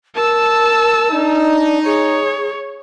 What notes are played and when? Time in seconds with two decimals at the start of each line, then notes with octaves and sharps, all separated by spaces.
0.15 A#4 A5 E6
1.11 D4 D#4
1.85 G#4 C#5